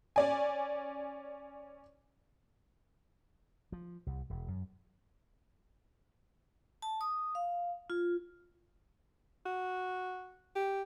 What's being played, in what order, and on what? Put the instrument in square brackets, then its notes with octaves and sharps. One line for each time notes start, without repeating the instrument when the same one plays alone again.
[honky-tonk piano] C#4 D5 G#5
[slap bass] F3
C2
E1
F#2
[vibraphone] A5
D#6
F5
F4
[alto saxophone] F#4
G4